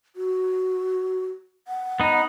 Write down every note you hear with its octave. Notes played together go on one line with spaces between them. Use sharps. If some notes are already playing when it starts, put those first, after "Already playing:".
F#4
F#5
B3 D#4